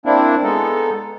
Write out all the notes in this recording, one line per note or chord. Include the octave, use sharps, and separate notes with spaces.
A#3 C4 D4 E4
G#3 B3 D#4 A4